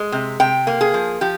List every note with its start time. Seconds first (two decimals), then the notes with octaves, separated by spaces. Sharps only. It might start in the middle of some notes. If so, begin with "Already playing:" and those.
Already playing: G#3
0.12 C3
0.40 C3 G5
0.67 A#3
0.81 G#4
0.94 F3
1.21 F3 G4